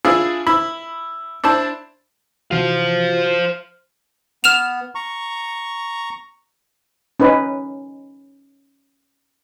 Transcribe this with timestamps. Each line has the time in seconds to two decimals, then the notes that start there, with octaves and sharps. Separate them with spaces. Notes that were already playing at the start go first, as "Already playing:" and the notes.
0.05 D4 E4 F4 G#4
0.47 E4 B5
1.44 D4 E4 C5 A5
2.51 C3 E3 F#4 C5 F5
4.44 B3 F6 E7 F7
4.95 A#5 C#6
7.20 C#4 D#4 B4